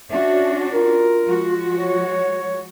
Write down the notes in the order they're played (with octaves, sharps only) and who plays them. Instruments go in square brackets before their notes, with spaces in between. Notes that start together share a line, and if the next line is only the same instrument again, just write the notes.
[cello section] C#4 D4 F#4 [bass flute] E5
[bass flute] F4 [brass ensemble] A#4
[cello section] F3 G#3 F#4
[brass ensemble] C#5